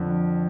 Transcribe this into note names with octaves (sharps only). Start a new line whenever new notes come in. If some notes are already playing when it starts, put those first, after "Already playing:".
Already playing: F2 D3